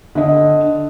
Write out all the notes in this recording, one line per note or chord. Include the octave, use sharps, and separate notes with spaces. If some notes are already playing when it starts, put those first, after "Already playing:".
D3 D#5